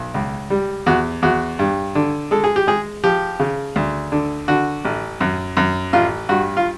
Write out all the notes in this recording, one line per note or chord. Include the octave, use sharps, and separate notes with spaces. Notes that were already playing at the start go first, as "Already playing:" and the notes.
Already playing: B1
C#2
G3
E2 F#4
E2 F#4
G2
D3
G#3 A4
G#4
G4
G#3 G#4
F3 G4
C#3
D2
D3
D3 F#4
A1
F#2
F#2
A1 F4
G2 F#4
F4